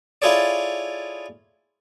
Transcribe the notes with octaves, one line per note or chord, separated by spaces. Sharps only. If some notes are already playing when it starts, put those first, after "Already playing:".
E4 F4 G#4 A4 C#5 D5